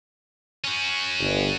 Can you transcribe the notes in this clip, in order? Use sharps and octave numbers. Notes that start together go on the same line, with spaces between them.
C#4 F#4
G1